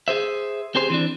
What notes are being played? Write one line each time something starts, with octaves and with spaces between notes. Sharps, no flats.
G#4 C5 E5
C4 G4 G#4 C5
E3 C4 D4